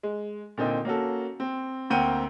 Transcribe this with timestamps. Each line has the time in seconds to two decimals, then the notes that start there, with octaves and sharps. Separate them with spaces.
0.03 G#3
0.58 A#2 D3 C4 D#4
0.85 A#3 C#4 F#4 A4
1.40 C4
1.90 D2 A#3 C4 F#5 G5 D#7